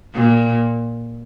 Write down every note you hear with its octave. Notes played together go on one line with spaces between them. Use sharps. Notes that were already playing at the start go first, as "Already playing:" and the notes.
A#2